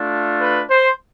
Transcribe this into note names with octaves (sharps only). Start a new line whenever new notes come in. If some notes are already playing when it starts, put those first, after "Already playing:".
Already playing: A3 D4 F4
B4
C5